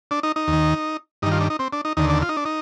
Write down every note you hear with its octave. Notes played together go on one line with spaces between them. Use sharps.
D4
D#4
D#4
D#2
D#3
G2 D#3 D#4
F4
D4
D#4
C4
D4
D#4
D#2 D3 D#4
D4
F4
D#4
D4
D#4